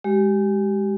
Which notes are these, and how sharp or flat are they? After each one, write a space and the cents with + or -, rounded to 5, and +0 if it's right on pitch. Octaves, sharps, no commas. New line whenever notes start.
G#3 -15 G4 -25